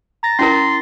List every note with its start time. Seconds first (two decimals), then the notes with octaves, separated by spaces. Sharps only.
0.23 A#5 A6 A#6
0.39 C#4 E4 A#4 C6